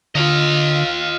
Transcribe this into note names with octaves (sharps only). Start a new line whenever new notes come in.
D3 F4 D#5 F5